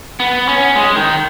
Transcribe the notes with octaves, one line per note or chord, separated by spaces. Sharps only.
B3
C#4
G#3
D#3